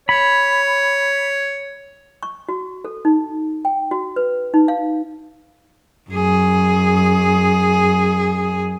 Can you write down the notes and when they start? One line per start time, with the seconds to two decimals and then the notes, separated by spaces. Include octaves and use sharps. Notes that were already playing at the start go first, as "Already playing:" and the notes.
0.09 C#5 B5
2.23 C#6
2.49 F#4
2.85 A4
3.05 D#4
3.65 G5
3.91 F#4
4.16 B4
4.54 D#4
4.68 F5
6.10 F#2 G#4